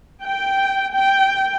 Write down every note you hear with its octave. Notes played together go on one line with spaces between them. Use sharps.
G5
G5